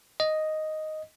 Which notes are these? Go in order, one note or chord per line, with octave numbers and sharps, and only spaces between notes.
D#5